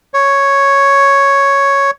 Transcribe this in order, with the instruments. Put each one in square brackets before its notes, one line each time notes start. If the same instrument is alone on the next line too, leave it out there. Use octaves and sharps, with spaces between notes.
[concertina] C#5